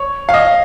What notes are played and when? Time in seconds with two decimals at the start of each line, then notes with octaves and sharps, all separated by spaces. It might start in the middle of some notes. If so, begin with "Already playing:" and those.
Already playing: C#5
0.29 F5
0.34 D#5